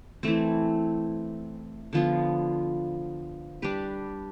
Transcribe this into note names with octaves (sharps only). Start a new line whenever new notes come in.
E3 A3 C4
D3 F3 B3 F4
G3 D4 G4 B4